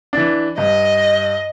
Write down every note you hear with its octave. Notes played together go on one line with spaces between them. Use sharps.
E3 D4
G2 D#5